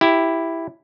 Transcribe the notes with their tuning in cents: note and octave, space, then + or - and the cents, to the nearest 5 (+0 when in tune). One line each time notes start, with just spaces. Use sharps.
E4 +0 G4 +0